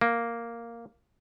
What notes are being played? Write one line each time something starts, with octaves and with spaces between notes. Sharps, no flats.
A#3